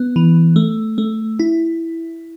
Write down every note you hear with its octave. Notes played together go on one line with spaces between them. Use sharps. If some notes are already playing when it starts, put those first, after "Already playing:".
Already playing: B3
E3
A3
A3
E4